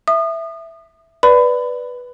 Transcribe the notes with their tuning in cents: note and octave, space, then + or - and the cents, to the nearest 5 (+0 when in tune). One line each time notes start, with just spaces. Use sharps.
E5 +0 D#6 -35
B4 -5 D5 +0 B5 +25